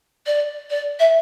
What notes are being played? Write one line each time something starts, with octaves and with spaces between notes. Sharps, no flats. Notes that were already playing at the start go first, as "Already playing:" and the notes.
D5
D5
E5